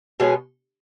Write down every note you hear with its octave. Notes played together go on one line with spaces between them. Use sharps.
B2 G#3 C#4 G#4